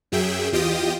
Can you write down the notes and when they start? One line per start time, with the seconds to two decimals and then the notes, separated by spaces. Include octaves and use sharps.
0.12 F#2 F#3 G#4 E5 G5
0.52 E2 F4 G4 D#5 G5 D#6